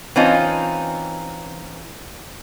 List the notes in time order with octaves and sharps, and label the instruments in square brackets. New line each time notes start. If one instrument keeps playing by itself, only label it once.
[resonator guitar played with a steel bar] E3 C4 C#4 D#4 F4